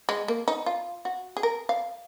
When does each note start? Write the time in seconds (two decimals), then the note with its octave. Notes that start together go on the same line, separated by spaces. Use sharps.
0.09 G#3
0.28 A#3
0.48 D#4
0.66 F4
1.05 F#4
1.37 G#4
1.43 A#4
1.69 F5